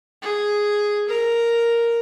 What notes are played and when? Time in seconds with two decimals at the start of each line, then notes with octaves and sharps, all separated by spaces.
0.22 G#4
1.09 A#4